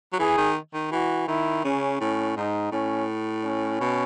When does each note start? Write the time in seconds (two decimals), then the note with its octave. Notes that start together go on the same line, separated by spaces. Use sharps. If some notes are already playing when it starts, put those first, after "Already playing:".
0.13 F#3
0.19 E3 G#4
0.37 D#3
0.74 D#3
0.91 E3 F#4
1.27 D#3 E4
1.64 C#3 C#4
2.01 A2 C#4
2.37 G#2 D#4
2.72 A2 C#4
3.44 C#4
3.81 B2